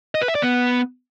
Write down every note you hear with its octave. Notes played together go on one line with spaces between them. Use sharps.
D#5
B4
E5
D5
B3